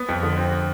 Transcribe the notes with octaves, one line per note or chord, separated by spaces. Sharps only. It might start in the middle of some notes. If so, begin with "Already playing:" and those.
Already playing: B3
F2
D3
C4